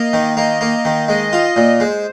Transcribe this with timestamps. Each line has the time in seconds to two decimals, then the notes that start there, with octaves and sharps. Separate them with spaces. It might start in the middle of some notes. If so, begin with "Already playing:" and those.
Already playing: A#3 D#5
0.13 D#3
0.37 A#3 D#5
0.61 A#3
0.85 D#3
1.08 G#3 D#5
1.33 F4
1.56 A#2
1.80 G#3 C5